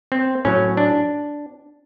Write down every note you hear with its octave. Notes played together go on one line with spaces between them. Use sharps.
C4
A2 F#3 C#4
D4